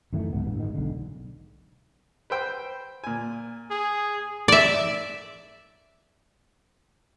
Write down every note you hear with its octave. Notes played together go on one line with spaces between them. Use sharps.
F#2 D#3 E3 A3
C#2 G#2 B3
A1 G2
G#2 D#3
B1 D3
B4 C5 G5
A#2 G#5
G#4
D5 E5